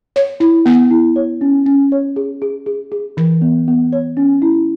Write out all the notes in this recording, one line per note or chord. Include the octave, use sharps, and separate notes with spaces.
C#5
E4
B3
E4
C#5
C#4
C#4
C#5
G#4
G#4
G#4
G#4
E3
B3
B3
C#5
C#4
E4